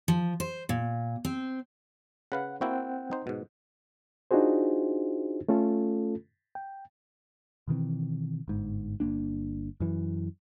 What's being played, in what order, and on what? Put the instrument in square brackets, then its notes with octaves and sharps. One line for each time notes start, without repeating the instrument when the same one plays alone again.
[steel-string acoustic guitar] F3
C5
A#2
C4
[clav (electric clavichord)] C#3 B4 F5 [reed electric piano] F#5
[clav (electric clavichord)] A#3 E4 F#4 [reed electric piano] C4 F#5 G5
[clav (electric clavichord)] D#4 C5
G#2 B2
[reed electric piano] D4 D#4 F4 F#4 G#4 C5
A3 C#4 F4 A4
G5
[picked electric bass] B2 D#3 E3 C4
G1 G#2
G1 F#2 A#3 D4
F#2 E3